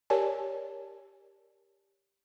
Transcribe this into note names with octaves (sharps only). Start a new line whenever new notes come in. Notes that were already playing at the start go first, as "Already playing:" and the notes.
G4 A#4 C#5 D5 G#5 A5